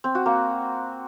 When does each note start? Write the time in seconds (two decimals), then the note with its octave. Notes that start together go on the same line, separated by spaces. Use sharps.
0.04 C4
0.15 F#4
0.26 A#3